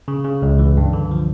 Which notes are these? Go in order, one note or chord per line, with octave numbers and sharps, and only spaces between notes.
C#3
C#3
C#2
E3
G2
D3
F3